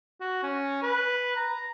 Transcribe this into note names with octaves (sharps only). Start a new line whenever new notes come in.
F#4
C#4
B4
A#5